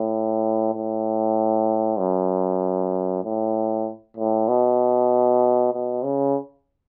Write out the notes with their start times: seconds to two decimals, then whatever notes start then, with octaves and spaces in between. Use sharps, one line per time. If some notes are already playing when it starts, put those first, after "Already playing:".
Already playing: A2
0.74 A2
1.99 F#2
3.24 A2
4.17 A2
4.49 B2
5.74 B2
6.04 C#3